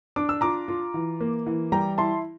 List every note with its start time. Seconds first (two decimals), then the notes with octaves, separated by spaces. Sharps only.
0.16 D4 D6
0.29 E6
0.41 F4 A#5 D6
0.68 F4
0.94 E3
1.20 A#3
1.47 E3
1.72 G3 G5 A#5
1.98 E4 A5 C6